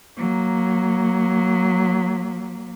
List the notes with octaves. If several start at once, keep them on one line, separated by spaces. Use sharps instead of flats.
F#3 A#3